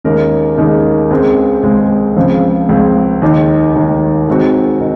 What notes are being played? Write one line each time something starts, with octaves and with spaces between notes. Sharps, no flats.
D#2 C#3 G#3 D#4 A#4
D#2 C#3 G#3 D#4 A#4
C#2 C#3 G#3 C4
C#2 C#3 G#3 C4
C#2 C#3 F3 C4
C#2 C#3 F3 C4
D#2 D#3 G#3 D#4 G#4
D#2 D#3 G#3 D#4 G#4
D#3 G#3 C4 F#4
D#3